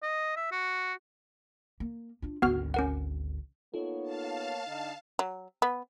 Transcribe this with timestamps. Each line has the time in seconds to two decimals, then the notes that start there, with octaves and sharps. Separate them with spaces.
0.02 D#5
0.37 E5
0.52 F#4
1.80 A#3
2.22 D4 F4
2.42 G#1 D2 B3 F#4 F6
2.74 C#4 A#4 F#5
3.74 A#3 B3 D#4 F4 A4 C#5
4.03 F5 A5
4.66 D3 D#4
5.19 F#3
5.62 B3